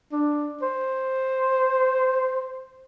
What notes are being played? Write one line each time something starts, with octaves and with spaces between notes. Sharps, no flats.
D4
C5